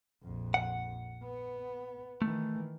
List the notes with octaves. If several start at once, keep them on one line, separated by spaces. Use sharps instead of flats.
A#1 F2
F#5
B3
D#3 E3 A3